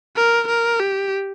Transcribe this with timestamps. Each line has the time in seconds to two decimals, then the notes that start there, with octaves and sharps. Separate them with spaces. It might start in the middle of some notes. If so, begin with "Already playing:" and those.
0.16 A#4
0.47 A#4
0.79 G4